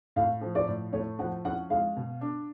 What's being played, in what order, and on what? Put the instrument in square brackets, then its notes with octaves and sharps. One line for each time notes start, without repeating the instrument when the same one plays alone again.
[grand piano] A2 [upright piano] F5
[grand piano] F3
[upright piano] D5
[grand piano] A2
[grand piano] A3 [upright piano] C#5
[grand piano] F3 [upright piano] F#5
[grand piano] C#4 [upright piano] F#5
[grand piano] G#3 [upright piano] F5
[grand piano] B2
D4